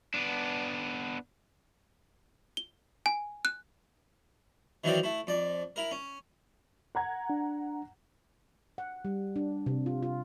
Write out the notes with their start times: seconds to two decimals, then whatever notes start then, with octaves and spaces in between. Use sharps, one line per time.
0.14 B3 D4
2.57 G7
3.06 G#5
3.45 F#6
4.84 D#3 E3 F#3 C4 A#4 D5
5.03 A3 E4
5.27 F2 D5
5.76 E4 A#4
5.91 C#4
6.95 F#5 A#5 G#6
7.30 D4
8.78 F#5
9.05 G3
9.36 D4
9.66 C3
9.86 F4
10.03 F4